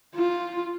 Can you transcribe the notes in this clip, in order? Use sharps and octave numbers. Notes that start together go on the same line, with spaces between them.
F4